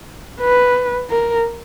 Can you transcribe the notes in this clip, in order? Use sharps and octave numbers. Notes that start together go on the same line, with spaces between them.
B4
A#4